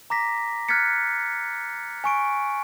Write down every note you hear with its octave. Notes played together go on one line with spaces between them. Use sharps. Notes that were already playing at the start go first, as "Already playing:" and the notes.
A#5 D6 A#6 B6
F6 F#6 G#6 A6 B6 C#7
G#5 C#6 D7